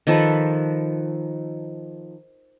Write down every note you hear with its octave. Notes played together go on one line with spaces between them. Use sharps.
D#3 F3 A4 B4